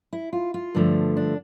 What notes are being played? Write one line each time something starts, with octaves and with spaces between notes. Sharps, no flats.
E4
F4
F4
G2 D3 F3 A3
D4